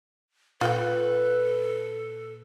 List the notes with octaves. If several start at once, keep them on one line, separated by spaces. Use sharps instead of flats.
A#2 F4 A4 B4 G5